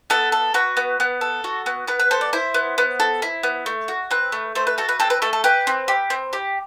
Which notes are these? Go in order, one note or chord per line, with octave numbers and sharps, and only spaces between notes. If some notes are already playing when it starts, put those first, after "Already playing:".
B3 A4
A4
F#4 B4
B3
B3
A4
F#4
B3
B3 B4
B4
A4 C5
D5
E4 C5
B3
B3
A4
E4
B3
A3
F#4
C4 B4
A3
A3 C5
B4
F#4 A4
B4
C4 A4
B4
A3 A4
A4
G4 B4
C4
G4
C4
G4